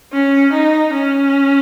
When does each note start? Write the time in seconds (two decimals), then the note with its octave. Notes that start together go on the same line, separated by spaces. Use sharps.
0.13 C#4
0.53 D#4
0.93 C#4